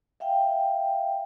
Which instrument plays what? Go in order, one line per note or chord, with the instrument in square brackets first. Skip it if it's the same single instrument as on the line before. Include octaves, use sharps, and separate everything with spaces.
[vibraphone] E5 F5 G5